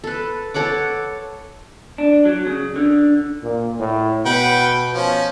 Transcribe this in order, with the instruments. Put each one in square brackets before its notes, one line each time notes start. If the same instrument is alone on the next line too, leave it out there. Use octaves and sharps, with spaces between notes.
[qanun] A4 B4
A4 C#5 F#5 D6
[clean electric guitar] D4
F#3
C#3
D3
[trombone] A#2
A2
[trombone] B2 [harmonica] B4 F#5 G5
[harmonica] F3 C#4